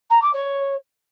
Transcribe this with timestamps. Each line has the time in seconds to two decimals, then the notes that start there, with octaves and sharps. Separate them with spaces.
0.10 A#5
0.21 D6
0.33 C#5